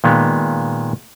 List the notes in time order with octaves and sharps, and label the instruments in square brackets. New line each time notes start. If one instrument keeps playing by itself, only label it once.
[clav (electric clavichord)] A#2 D#3 G#3 B3